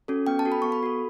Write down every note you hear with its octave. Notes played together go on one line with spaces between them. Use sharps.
C#4 F#4 A4
B3 G5
A5
F#4 A4
B5
B3 C#6
B5
F#4 A4